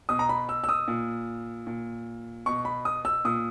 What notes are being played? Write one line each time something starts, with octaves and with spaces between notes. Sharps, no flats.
B2 D#6
A#5
B5
E6
E6
D#6
A#2
A#2
B2 C#6
B5
D#6
E6
A#2 D#6